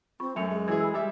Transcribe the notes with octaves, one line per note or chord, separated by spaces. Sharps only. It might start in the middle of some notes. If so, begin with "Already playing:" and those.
C4 F4 B5 C#6
F#2 A3 E5 C#7 F7
G#3
E3 F#4 G#4 G#6
B5 E6
G3 G#4 E5